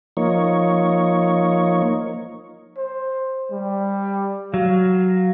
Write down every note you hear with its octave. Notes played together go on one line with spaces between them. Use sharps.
F3 A#3 D#4 C#5
C5
G3
F#3 F5